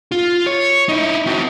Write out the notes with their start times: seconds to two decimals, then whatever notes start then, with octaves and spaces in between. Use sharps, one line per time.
0.12 F4
0.47 C#5
0.89 D#4 E4
1.26 C4 F#4